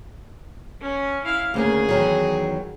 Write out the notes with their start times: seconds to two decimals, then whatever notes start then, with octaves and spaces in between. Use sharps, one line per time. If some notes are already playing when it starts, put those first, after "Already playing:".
0.81 C#4
1.24 E4 F5
1.54 D2 C#3 A#3 G#4
1.89 E2 D#3 F#3